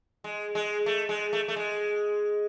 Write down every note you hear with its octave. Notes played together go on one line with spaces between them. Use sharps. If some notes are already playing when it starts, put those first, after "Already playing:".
G#3
G#3
A3
G#3
A3
A3
G#3